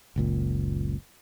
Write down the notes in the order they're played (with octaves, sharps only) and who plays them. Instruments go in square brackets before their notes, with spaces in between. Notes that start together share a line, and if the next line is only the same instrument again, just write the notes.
[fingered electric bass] F#1 C#2 A#2